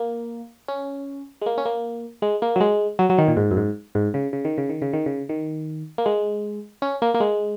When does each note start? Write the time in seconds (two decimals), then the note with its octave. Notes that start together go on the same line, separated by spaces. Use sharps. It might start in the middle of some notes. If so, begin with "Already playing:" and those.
Already playing: A#3
0.68 C#4
1.42 G#3
1.46 A#3
1.58 C#4
1.65 A#3
2.22 G#3
2.42 A#3
2.56 F#3
2.60 G#3
2.99 F#3
3.10 F#3
3.18 D#3
3.28 A#2
3.37 G#2
3.51 F#2
3.57 G#2
3.95 G#2
4.14 C#3
4.33 C#3
4.45 D#3
4.58 C#3
4.69 D#3
4.82 C#3
4.93 D#3
5.06 C#3
5.29 D#3
5.98 A#3
6.06 G#3
6.82 C#4
7.02 A#3
7.14 A#3
7.20 G#3